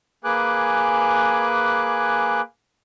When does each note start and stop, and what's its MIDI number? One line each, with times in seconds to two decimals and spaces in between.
0.24 2.41 58
0.24 2.41 68
0.24 2.41 71
0.24 2.41 80
0.24 2.41 86
0.24 2.41 90